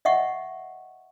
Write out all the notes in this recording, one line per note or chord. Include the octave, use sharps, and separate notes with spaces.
D#5 E5 F#5 C#6